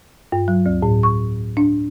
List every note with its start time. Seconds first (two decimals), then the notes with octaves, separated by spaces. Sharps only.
0.32 G2
0.48 F#3
0.66 D2
0.82 A2
1.03 C#6
1.57 D4